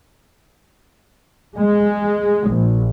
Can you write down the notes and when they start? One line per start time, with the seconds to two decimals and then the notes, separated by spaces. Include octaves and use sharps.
1.57 G#3
2.48 A#1